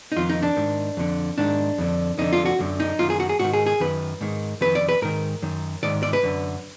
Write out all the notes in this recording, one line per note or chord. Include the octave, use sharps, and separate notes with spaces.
D#4
F2 D#3 F4
D#4
D4
G#2 D#3
F2 D3
G#2 D#3 D4
F2 D3
F2 D3 D#4
F4
F#4
F#2 D3
D#4
F#2 D#3 F4
G#4
F#4
G#4
G#2 D#3 F#4
G#4
G#4
F#2 D#3 B4
G#2 D#3
F2 D#3 B4
D5
B4
G#2 D#3 A#4
F#2 D#3
G#2 D#3 D5
D5
B4
F#2 D3